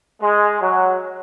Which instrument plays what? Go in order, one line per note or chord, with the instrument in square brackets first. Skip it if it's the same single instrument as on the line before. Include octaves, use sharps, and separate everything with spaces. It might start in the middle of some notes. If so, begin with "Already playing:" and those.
[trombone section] G#3
F#3